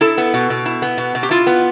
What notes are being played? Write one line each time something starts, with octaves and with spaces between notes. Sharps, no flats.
E4 A4
B3
B2
B2
E4
B3
B2
B2
G4
E4 F4
B3